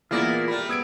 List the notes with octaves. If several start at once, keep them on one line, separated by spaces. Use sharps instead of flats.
E3 A#3 B3 E4 F4 G#4 A#4 D5
G3 A3 B5
B3 E6 G#6 D7